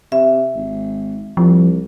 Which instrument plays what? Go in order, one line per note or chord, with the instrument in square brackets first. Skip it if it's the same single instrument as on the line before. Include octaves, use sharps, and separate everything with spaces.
[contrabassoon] C3 [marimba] E5
[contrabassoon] G#1
[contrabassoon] C2 [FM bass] F3